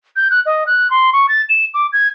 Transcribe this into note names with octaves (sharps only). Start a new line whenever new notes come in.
G6
F#6
D#5
F#6
C6
C#6
A6
E7
D6
G#6